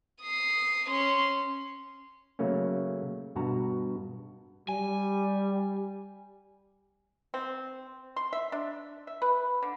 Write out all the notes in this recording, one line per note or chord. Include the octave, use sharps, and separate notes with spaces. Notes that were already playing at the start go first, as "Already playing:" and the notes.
D#6 C7
C#4 C6
C#3 F#3 A3 A#3 C#4
G2 B2 F#4 A5 A#5
G3 G#5
C4
C6
E5
D4
E5
B4
D3